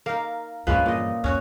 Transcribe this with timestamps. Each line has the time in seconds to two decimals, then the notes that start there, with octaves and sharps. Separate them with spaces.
0.06 A#3 D#4 A#4 F5
0.67 E2 G2 F3 G#3 A#3 C#4 B4
0.86 A#2 D#5
1.24 F2 C#4 F#4 C#5